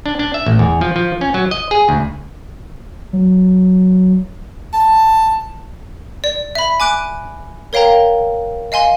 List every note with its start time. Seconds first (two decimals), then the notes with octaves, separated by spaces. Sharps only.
0.06 D4
0.19 D4
0.34 E5
0.46 A1
0.59 E2
0.81 F3
0.96 F3
1.21 C#4
1.34 F#3
1.51 D#5
1.71 G#4
1.89 D2
3.13 F#3
4.73 A5
6.24 D5
6.55 E5 B5
6.80 G#5 D6 F#6 D7
7.73 A#4 C#5 F5 G5 A#5
8.72 D#5 F5 G#5 C6